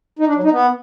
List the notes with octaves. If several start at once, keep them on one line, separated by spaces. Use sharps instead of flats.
D#4
D4
F#3
D#4
B3